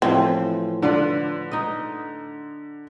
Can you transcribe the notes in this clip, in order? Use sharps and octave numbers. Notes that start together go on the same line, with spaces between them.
A2 E3 F3 C4
D3 D4 F4 B4
D#4 D#5